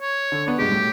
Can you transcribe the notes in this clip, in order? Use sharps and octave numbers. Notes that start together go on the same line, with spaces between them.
C#5
D3
B3 D4
G2 B2 G#3 G4
A2